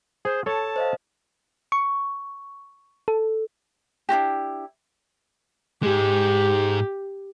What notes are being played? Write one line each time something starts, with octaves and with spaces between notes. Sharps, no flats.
G#4 C5
A4 C#5 A5
C5 D#5 F5
C#6
A4
D4 E4 F#4 G4
G#2 G#3 G4